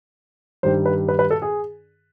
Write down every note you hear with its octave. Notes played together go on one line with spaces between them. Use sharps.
G2 D#3 G3 C5
B4
B4
B4
A4
G#4